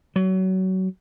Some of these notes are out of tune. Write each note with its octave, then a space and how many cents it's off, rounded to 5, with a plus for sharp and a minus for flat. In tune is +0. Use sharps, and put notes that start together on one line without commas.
F#3 +25